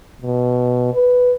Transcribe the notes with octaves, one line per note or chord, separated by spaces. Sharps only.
B2
B4